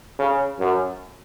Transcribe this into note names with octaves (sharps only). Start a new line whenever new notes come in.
C#3
F#2